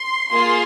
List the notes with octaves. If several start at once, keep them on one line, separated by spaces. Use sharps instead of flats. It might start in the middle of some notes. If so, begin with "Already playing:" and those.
Already playing: C6
A#3 F4 G#4 C6